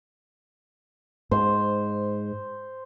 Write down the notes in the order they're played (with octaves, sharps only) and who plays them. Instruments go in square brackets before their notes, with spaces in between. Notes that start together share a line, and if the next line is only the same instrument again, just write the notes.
[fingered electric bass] G#2 [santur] C5